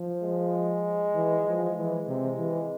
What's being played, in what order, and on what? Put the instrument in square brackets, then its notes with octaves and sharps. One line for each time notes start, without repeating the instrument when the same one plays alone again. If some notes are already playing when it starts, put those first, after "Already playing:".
Already playing: [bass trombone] F3
[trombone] G#3
[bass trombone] E3
F3
[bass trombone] E3 [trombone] G#3
[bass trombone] C3
E3